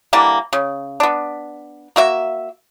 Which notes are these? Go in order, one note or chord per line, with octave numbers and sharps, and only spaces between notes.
D3 E3 G3 A#3
C#3
B3 D4
A#3 F#4 E5